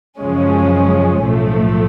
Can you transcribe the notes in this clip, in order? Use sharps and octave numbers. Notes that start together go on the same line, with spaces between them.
F#2 C#3 F3 G#3 C#4
B1 A2 F3 A3